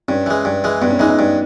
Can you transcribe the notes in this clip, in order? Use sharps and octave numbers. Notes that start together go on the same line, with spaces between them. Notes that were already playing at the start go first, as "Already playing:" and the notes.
G2 C#4
E3 G#3
G2
E3 G#3
G2 B3
C#4
E3 G#3 D#4
D#4
G2